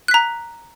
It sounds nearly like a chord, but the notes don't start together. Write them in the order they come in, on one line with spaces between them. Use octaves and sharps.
F#6 B6 A#5